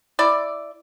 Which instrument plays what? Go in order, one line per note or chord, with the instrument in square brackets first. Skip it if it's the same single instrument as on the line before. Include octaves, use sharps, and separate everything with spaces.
[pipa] E4 D5